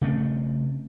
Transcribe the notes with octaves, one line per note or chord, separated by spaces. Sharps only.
C#3 A3 C4